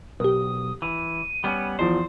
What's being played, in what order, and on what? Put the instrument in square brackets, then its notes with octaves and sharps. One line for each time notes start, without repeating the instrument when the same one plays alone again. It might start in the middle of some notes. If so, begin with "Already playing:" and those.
[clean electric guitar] B1 [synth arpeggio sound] G4 A#4 [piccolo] D#6
[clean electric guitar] E3 [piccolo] D#7
[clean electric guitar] G3 B3 C#4
[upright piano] E2 E3 F3 [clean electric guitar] C5